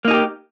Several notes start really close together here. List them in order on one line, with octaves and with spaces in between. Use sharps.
A#3 D#4 G#4 G4